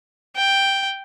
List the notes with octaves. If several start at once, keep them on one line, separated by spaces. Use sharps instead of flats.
G5